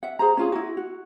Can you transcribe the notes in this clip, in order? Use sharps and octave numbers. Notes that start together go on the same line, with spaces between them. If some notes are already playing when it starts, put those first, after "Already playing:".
E5 F#5
G#4 C5 A#5
C#4 F4 G#4
E4 F#4
F#4